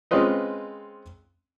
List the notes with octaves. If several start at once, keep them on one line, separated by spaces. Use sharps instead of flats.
G#3 C4 C#4 F4 B4 D#5